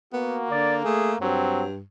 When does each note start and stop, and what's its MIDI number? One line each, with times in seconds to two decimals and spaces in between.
0.13 1.20 58
0.13 0.39 59
0.13 0.49 66
0.51 0.84 50
0.51 0.74 74
0.85 1.16 57
0.85 1.12 68
1.21 1.82 43
1.21 1.66 54
1.21 1.63 60